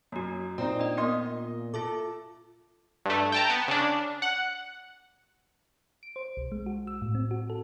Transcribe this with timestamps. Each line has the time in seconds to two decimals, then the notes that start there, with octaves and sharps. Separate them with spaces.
0.12 F#2 A#3 F#4
0.58 A#2 C4 D#4 D5
0.80 D4 D#5
0.98 B3 A#4 D#5 C6
1.74 F4 A4 E5 D6
3.06 G2 A3
3.32 G5 A5 A#5
3.50 B3
3.68 C#3 D4
4.22 F#5
6.03 D7
6.16 C5
6.37 B1
6.52 G#3
6.66 F#4
6.87 E6
7.02 A2
7.15 C4
7.31 F#4
7.50 A4